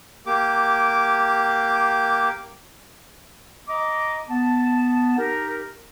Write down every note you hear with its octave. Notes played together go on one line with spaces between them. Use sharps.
A#3 G4 D6
D#5 A#5 D6
B3 A5
D#4 G4 A#4